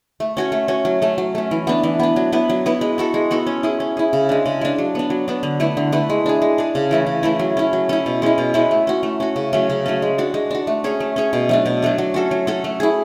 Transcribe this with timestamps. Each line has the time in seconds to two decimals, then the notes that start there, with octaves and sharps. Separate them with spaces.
0.20 A3
0.37 C#4 F#4 C#5
0.52 A3
0.68 C#4 F#4 C#5
0.85 F#3
1.02 A3 C#4
1.18 F#3
1.35 A3 C#4
1.51 E3
1.67 B3 D4
1.83 E3
1.99 B3 D4
2.16 F#3
2.32 B3 E4 B4
2.49 F#3
2.66 B3 E4 B4
2.81 G#3
2.98 B3 F#4 A4
3.14 G#3
3.31 B3 F#4 A4
3.46 C#4
3.63 E4 G#4
3.80 C#4
3.97 E4 G#4
4.13 C#3
4.29 G#3 D4
4.46 C#3
4.61 G#3 D4
4.78 F#3
4.95 B3 D4
5.10 F#3
5.28 B3 D4
5.43 D3
5.60 A3 E4 B4
5.77 D3
5.92 A3 E4 B4
6.10 G#3
6.26 D4 G#4
6.42 G#3
6.58 D4 G#4
6.75 C#3
6.91 E3 A3 E4
7.07 C#3
7.23 E3 A3 E4
7.39 F#3
7.57 C#4 E4
7.73 F#3
7.89 C#4 E4
8.06 B2
8.22 G#3 C#4 E4
8.38 B2
8.54 G#3 C#4 E4
8.71 A3
8.87 C#4 F#4
9.03 A3
9.20 C#4 F#4
9.36 C#3
9.53 F#3 A3 C#4
9.70 C#3
9.86 F#3 A3 C#4
10.02 G#3
10.18 D4 F#4
10.34 G#3
10.51 D4 F#4
10.67 A3
10.84 C#4 G#4 C#5
11.00 A3
11.16 C#4 G#4 C#5
11.33 B2
11.49 F#3 A3 D4
11.66 B2
11.82 F#3 A3 D4
11.98 F#3
12.14 C#4 F#4 A4
12.31 F#3
12.47 C#4 F#4 A4
12.64 A3
12.80 E4 G#4